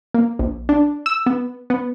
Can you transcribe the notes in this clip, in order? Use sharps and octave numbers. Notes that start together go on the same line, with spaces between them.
A#3
A#1
D4
E6
B3
B3